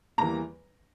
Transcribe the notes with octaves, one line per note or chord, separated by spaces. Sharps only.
E2 E3 G3 A#3 A#5